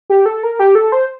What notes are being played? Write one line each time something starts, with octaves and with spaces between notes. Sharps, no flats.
G4
A4
A#4
G4
A4
C5